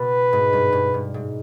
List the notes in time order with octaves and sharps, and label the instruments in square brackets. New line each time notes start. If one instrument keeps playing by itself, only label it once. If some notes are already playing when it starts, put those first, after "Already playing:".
Already playing: [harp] B2 [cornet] B4
[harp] G#2
G2
G2
G2
G#2